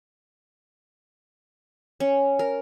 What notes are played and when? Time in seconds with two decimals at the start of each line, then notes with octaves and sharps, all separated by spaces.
2.00 C#4
2.39 A#4